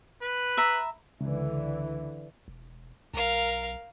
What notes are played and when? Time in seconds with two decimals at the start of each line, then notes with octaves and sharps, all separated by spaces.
0.23 B4
0.57 E5 A#5 B5
1.21 C#2 D3 E3
2.48 E1
3.14 B1 A#4 F5